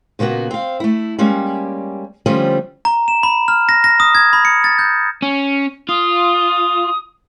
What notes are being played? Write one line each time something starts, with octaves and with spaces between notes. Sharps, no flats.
A#2 C#3 A#3 B3 F#4
C4 F5
A3 E4
G3 G#3 A#3 C#4
D3 F3 G3 A3 C4 C#4
A#5
E7
B5
F6
A#6
A#6
D#6
G#6
B5
C#7
A6
G6
C#4
F4 D#6